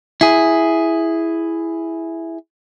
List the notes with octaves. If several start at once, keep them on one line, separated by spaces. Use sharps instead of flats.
E4 G#4